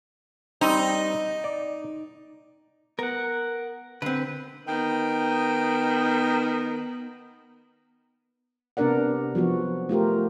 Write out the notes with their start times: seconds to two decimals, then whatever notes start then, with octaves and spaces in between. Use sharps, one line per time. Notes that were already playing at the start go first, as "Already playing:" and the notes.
0.61 G3 C4 D#4
1.44 D5
2.99 B3 A#4 F#5
4.02 D3 C4 B4
4.67 D#3 B3 G5
8.77 C3 B3 D4 A#4 D5 F#5
9.35 F3 F#3 B3 F#4
9.89 A3 F4 G4 A#4